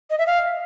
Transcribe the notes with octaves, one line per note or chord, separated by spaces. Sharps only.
D#5
E5
F5